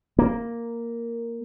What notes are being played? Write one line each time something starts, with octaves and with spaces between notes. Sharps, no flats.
A#3